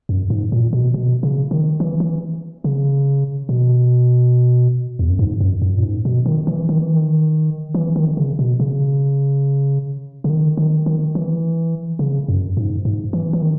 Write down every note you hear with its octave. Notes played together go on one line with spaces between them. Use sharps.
F#2
G#2
A#2
B2
B2
C#3
D#3
E3
E3
C#3
B2
E2
F#2
G#2
F#2
F#2
A#2
G#2
B2
D#3
E3
D#3
E3
D#3
E3
D#3
C#3
B2
C#3
C#3
D#3
D#3
D#3
E3
C#3
F#2
G#2
G#2
E3
E3
D#3